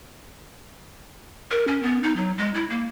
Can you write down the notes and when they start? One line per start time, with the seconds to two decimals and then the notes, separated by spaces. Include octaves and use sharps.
1.51 A#4
1.68 C#4
1.83 B3
2.03 D#4
2.16 F#3
2.38 G#3
2.54 E4
2.70 A#3